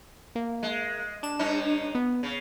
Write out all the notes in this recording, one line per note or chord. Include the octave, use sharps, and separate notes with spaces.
A#3
G#3
D4 E7
G2 C#4 D#4
B3
C#3